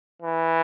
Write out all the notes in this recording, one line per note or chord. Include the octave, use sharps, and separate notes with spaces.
E3